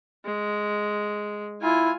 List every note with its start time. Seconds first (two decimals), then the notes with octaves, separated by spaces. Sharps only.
0.25 G#3
1.62 E4 F4 G#5